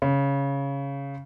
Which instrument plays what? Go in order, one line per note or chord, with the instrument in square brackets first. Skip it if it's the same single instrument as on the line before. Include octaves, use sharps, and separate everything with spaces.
[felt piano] C#3